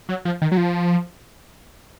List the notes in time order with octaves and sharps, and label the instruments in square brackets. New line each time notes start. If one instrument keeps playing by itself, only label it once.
[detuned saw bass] F#3
F3
D#3
F#3
F3